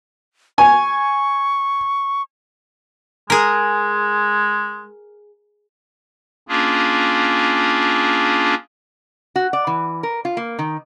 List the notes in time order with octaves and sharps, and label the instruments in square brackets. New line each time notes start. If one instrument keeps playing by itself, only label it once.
[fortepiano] G#5 [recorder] C#6
[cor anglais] G#3 [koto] G#4 A#4
[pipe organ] A#3 C#4 D4 F4 G#4
[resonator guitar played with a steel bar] F#4
D5
E3
A#4
F4
A#3
D#3